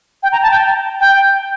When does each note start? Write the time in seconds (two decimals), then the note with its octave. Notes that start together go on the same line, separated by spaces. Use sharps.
0.23 G5
0.32 A#5
0.43 A5
0.51 G5
1.00 G5